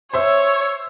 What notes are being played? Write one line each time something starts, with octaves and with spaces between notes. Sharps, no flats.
C5 C#5 E5 E6